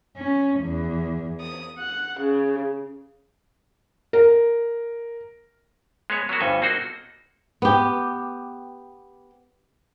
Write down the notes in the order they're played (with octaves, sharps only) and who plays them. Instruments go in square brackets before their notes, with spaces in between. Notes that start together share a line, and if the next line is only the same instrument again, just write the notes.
[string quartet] C#4
E2
D#6
F#5
C#3
[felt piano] A#4
[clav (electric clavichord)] G#3 B3 C#5
F#3 A#3 B3 F#4
G1 D2 G2 G3 A4 G#5
A#3 C4 D#4 F#4 A4 C5
[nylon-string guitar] B3 G4